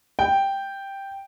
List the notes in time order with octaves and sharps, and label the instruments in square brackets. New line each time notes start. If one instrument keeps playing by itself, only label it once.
[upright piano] G5